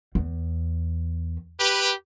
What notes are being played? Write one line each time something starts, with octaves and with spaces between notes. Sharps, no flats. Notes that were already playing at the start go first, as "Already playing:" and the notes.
E2
G4 B4